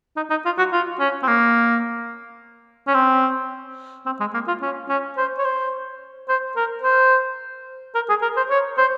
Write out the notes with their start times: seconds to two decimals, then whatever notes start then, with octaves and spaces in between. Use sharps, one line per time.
0.17 D#4
0.30 D#4
0.45 F4
0.58 F#4
0.72 F4
1.00 C#4
1.23 C4
1.28 A#3
2.87 C#4
2.94 C4
4.06 C4
4.20 G#3
4.34 A#3
4.48 F4
4.62 C#4
4.89 C#4
5.17 C5
5.38 C#5
5.45 C5
6.29 C5
6.56 A#4
6.83 C5
7.95 A#4
8.09 G#4
8.22 A#4
8.37 C5
8.50 C#5
8.78 C5